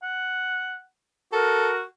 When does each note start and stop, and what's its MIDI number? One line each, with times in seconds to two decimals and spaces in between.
0.03 0.82 78
1.32 1.83 66
1.32 1.70 69
1.32 1.78 70